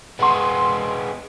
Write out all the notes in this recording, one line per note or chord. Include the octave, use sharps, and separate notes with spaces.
G#3 B3 F#5 C6